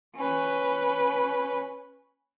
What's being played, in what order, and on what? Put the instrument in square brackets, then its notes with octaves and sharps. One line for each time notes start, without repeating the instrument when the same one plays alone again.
[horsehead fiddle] C#4 B4